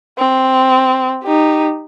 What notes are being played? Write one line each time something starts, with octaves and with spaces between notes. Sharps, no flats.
C4
D#4 G4